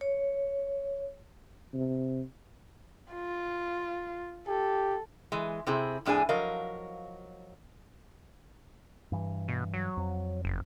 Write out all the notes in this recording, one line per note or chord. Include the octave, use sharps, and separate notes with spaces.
C#5
C3
F4
G4 A4
E3 G#3
C3 C4 E4 G#4
F2 A2 D4 G#4 G#5
F3 F#3 A#4 D#5 F5
G2 E3
B2
F#3
F2
F#1